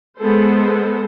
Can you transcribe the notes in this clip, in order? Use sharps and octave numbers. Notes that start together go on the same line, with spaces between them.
G#3 B3 A4 C5